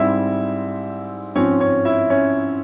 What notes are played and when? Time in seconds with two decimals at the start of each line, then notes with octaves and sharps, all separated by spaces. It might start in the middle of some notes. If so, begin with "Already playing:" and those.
Already playing: G#2 G3 C4 E4 E5
1.35 G#2 F3 C4 C#4 C#5
1.60 C#4 C#5
1.85 E4 E5
2.10 C#4 C#5